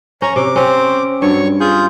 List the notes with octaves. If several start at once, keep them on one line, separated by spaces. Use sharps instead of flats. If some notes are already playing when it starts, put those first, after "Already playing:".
C#4 C#5 A#5
C3 D6
C4 C#4
G2 F#3 C#5 C#6
F4 G#4 G6